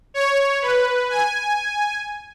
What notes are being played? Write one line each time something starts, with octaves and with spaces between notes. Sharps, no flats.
C#5
B4
G#5